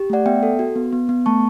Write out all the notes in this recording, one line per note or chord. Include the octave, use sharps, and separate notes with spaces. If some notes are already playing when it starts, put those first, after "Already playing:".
Already playing: G4
A3 D5 F#5
B3 E5 G5
A4
F#4
B3
B3
B3
A3 A5 C#6